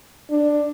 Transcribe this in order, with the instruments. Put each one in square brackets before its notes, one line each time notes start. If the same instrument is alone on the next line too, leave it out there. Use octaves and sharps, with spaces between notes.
[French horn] D4